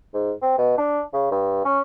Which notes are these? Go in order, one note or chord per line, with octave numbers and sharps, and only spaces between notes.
G#2
C4
B2
D4
C#3
G2
C#4